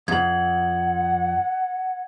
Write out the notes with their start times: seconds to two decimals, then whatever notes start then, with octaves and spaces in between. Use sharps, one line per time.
0.08 F2 F#5 G#6 F#7